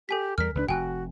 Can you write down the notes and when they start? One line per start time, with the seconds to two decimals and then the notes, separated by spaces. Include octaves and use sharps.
0.09 G4 A4 G#5 B6
0.38 E2 G3 A#4 F6 B6
0.55 C#2 F#3 D4 B4
0.69 F1 F#4 G5 G#5 F#6